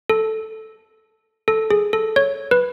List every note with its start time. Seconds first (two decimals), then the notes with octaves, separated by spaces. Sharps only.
0.09 A4
1.48 A4
1.71 G#4
1.93 A4
2.16 C#5
2.51 B4